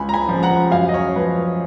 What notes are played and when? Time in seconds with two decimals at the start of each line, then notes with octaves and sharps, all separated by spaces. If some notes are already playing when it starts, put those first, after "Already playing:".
Already playing: C#2 G#5 B5
0.09 A#5
0.14 G#5 B5
0.29 C#3 F3
0.43 F#5 A#5
0.71 F#2 F5 G#5
0.89 D#5
0.94 C#5
1.16 F3 B4